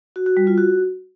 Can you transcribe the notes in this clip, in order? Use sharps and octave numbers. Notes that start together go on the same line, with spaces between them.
F#4
F#4
G3
F4
F#4